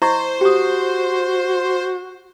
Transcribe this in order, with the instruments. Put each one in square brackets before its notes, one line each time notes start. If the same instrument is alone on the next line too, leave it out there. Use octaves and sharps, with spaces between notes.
[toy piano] E4 D#5 C#6 [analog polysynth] C5
[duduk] F#4 [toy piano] G4 D#6